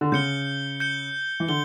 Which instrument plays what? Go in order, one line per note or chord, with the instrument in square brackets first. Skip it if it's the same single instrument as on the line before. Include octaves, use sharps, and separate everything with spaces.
[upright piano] D3
[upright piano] C#3 [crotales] G6 C#7 G7
[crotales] G6 C#7 G7
[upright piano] E3
[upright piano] D3 [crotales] G7